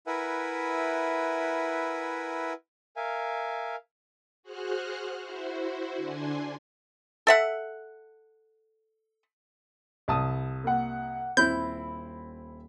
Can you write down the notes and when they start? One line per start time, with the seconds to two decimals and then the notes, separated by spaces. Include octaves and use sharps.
0.07 E4 A#4 B4 E5 F#5 G#5
2.96 A#4 E5 F5 G#5
4.43 F#4 G#4 C5 F6 F#6
5.21 E4 F#4 C5
5.97 D3 D4 G#5 C6
7.27 A4 E5 F#5
10.08 C2 A5 D#6
10.64 A#3 F#5
11.37 D#1 C4 E4 B5 G6